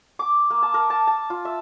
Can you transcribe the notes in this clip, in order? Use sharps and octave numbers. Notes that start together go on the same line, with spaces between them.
D6
A#3
A5
A#4
A5
A5
F4
E5